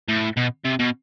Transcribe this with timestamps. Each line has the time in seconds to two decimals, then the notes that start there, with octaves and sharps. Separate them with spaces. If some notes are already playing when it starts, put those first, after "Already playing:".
0.09 A2
0.37 B2
0.65 C3
0.79 B2